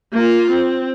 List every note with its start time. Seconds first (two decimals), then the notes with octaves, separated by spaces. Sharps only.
0.13 A#3 F4
0.51 C4